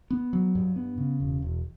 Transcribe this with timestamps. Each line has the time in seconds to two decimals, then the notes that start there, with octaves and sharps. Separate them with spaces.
0.11 B3
0.33 F#3
0.55 G2
0.76 B3
0.98 C#3
1.20 E1
1.42 E1